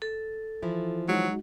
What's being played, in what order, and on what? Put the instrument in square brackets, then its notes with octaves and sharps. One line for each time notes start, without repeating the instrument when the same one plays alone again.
[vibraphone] A4
[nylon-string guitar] E3 F3 E4
[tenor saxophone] F#3 [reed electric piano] G#3 D#4 F#4